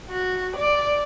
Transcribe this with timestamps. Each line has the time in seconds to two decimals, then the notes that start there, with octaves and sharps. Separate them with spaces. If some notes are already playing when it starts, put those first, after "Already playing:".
0.11 F#4
0.56 D5